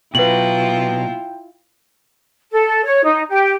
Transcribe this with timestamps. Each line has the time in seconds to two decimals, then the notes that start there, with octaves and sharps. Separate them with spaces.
0.15 B2 F#3 E4 F4 B4 G5 F#7
2.51 A4
2.85 C#5
3.04 D#4
3.29 G4